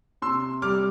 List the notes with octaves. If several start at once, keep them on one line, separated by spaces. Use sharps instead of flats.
C3 C6 E6
G3 D6 F6